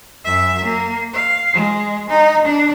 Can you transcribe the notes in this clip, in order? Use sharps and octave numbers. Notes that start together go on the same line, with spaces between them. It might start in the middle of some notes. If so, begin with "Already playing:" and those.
F#2 E5
A#3
F5
G#3
D#4
D4